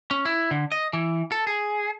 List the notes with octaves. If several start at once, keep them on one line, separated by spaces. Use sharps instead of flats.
C#4
E4
D3
D#5
E3
A4
G#4